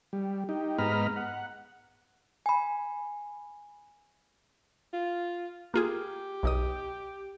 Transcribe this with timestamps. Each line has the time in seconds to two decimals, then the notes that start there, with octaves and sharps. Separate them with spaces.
0.13 G3
0.49 D#4 G4
0.78 G#2 B3 D#5 A#5 B5 F6
1.16 F#5
2.46 G#5 B5
4.93 F4
5.74 A#3 F4 G4 G#4
6.43 B1 D#4 D#6